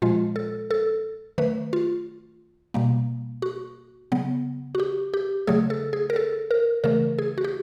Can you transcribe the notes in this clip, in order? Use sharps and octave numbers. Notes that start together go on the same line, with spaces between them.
A#2 F3 G#3 F4
A4
A4
D#3 F#3 A3 B4
F4
B2 G3 A#3
F#4
C#3 F#3 B3
F#4
G4
G4
C#3 F#3 A3 G#4
A4
G#4
A#4
A4
A#4
C#3 E3 A3 A#4
G#4
F#4
G4